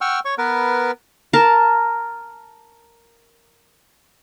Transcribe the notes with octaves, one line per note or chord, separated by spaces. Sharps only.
F#5 G5 C#6 E6 F6
C#5 C#6
B3 A#4 B4
A#4 A5